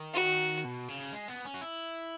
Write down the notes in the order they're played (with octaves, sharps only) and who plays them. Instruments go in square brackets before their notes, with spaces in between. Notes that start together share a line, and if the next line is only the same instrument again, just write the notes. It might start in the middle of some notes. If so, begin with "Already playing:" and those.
Already playing: [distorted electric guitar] D#3
[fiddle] F#4
[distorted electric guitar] B2
C#3
G#3
B3
C#4
F#4
E4